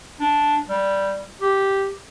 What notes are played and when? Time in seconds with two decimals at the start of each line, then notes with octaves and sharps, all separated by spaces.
0.20 D4
0.69 G3
1.41 G4